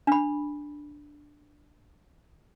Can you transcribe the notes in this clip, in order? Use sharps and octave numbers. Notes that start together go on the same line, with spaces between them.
D4 B5